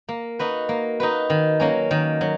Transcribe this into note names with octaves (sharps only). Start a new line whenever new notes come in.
A#3
D#4 F#4 B4
A#3
D#4 F#4 B4
D#3
F#3 A#3 C#4
D#3
F#3